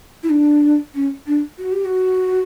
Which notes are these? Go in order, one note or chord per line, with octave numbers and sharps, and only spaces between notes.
E4
D4
C#4
D4
F#4
G4
F#4